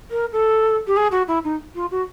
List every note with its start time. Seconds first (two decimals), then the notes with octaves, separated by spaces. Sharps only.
0.11 A#4
0.33 A4
0.87 G4
0.96 G#4
1.11 F#4
1.28 E4
1.44 D#4
1.75 F4
1.91 F#4